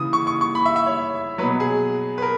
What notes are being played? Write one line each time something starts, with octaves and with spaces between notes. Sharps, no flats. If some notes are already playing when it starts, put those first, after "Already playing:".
Already playing: C#3 E3 D#6
C#6
C#6
C#6
B5
E5
E5
C#5
B2 F#3 B4
G#4
B4
A#4